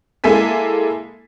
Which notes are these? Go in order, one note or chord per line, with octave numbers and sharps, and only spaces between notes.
G#3 A#3 E4 A4 G#5 B6